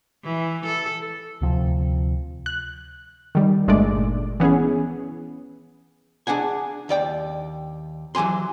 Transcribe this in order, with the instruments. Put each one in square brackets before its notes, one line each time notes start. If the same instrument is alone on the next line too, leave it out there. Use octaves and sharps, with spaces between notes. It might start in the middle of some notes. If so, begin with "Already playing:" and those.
[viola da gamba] E3
A4
[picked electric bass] D2 C3 F3 C4
[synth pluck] F#6
D#3 G3
G1 A#2 G#3 A3 D4 D5
E3 B3 C#4 G#4
[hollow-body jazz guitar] D4 G#4 F#5 G#5
D#2 D5 G5
E3 F#3 G4 G#5 C6